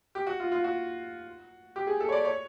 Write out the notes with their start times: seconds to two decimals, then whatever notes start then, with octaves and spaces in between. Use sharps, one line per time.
0.15 G4
0.27 F#4
0.40 F4
0.52 F4
0.64 F#4
1.76 G4
1.87 G#4
2.00 A4
2.09 C#5
2.12 D5
2.25 C#5